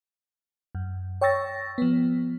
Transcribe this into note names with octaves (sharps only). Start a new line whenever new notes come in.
F#2
C#5 G5 C#6 E6 A6 A#6
F3 B3